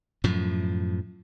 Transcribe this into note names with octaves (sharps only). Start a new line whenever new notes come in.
F#2 A2 F3